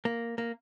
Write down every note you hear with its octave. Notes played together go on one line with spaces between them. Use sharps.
A#3
A#3